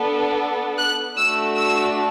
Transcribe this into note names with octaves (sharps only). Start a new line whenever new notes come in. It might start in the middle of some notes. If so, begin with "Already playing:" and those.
Already playing: B3 D4 A4
F#6
A3 D4 F#4 E6
E6